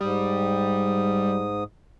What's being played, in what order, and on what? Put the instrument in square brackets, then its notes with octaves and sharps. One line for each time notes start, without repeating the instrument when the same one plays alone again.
[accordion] G#2 D#6 [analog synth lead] G3